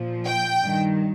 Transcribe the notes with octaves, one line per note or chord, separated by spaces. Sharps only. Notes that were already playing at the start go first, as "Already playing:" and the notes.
Already playing: A#2 F3
G5
G2 D#3